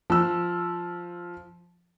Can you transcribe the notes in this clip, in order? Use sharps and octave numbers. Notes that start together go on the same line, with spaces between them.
F3 E6